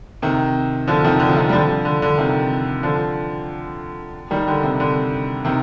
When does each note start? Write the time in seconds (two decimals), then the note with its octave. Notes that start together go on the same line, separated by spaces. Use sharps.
0.22 C3 D#3
0.87 D3 F3
1.04 C3 D#3
1.20 D3
1.29 F3
1.36 C3 D#3
1.49 G3
1.52 D3 F3
1.85 D3
2.02 D3
2.18 C3 D#3
2.83 D3 F3
4.31 D#3 G3
4.48 D3
4.63 C3
4.80 D3
5.45 C3 D#3